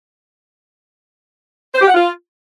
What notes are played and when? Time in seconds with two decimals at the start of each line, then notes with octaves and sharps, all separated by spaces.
1.75 C5
1.81 G4
1.88 F#5
1.94 F4